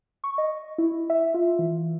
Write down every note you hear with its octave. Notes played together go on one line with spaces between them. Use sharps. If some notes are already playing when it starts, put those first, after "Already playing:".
C#6
D#5
E4
E5
F4
E3